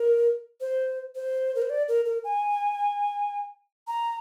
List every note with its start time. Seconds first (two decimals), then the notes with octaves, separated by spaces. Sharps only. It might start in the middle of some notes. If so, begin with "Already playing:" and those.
Already playing: A#4
0.61 C5
1.15 C5
1.55 A#4
1.62 C5
1.70 D5
1.88 A#4
2.06 A#4
2.24 G#5
3.87 A#5